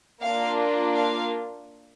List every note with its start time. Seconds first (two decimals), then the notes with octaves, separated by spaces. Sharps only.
0.22 A#3 D4 F4 F5
0.96 F5